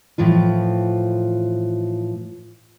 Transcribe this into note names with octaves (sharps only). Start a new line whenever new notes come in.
A2 E3 F3 F4